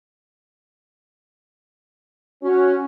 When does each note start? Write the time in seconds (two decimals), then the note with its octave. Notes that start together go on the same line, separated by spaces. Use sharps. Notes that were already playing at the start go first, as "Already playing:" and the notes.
2.43 C#4 F#4